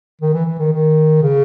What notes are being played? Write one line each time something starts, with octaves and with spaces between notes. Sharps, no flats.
D#3
E3
E3
D#3
D#3
C#3